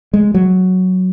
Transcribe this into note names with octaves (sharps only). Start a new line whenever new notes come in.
G#3
F#3